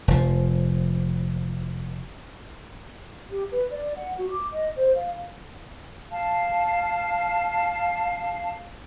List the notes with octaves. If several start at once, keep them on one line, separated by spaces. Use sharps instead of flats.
F1 F3
G4
B4
D5
F#5
F#4
D6
D#5
C5
F5
F5 A5